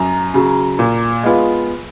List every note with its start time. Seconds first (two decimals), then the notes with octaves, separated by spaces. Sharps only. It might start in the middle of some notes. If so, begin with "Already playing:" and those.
Already playing: F#2 A#5
0.34 C#3 F#3
0.79 A#2
1.23 G#3 B3 F4